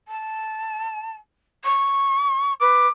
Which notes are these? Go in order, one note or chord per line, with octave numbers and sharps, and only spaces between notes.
A5
C#6
B4 D6